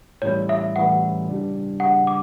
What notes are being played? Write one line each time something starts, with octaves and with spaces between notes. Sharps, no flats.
A2 E3 G3 C#4 E4 C#5
E5
A2 E3 G3 C#4 E4 F#5
C#3 G3 D4
C#3 G3 D4 F#5
D6